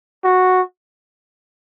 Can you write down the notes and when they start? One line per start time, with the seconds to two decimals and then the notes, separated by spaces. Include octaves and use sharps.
0.24 F#4